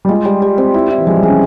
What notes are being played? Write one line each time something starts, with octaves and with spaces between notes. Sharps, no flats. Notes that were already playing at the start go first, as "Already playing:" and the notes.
G3
G#3 F4
G3
G3
C4
E4
E4
E3
F3 G#3
G3
C#4 G#4